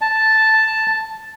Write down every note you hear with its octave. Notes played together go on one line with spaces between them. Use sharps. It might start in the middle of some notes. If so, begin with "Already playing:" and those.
A5